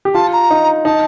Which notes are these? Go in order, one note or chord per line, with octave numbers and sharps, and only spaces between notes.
G4
F4 A5
A#5
D#4
D#4 A5